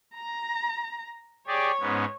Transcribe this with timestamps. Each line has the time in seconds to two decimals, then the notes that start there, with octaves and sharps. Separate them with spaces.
0.14 A#5
1.48 G4 G#4 C#5 D5
1.81 G#2 B3 C#4